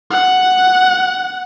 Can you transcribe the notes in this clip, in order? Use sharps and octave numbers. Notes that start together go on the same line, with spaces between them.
F#5